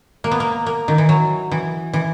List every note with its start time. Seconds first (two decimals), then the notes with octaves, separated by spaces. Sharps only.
0.24 A#3
0.31 B3
0.40 A#3
0.66 A#3
0.88 D#3
0.98 E3
1.09 F#3
1.52 E3
1.94 E3